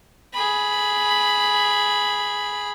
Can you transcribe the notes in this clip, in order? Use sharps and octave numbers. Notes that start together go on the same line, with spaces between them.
G#4 B5